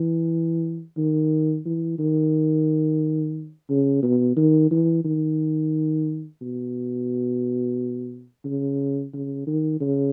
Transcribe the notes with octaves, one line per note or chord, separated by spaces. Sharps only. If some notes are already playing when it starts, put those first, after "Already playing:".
Already playing: E3
D#3
E3
D#3
C#3
B2
D#3
E3
D#3
B2
C#3
C#3
D#3
C#3